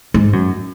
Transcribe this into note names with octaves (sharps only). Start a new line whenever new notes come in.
G#2
F#2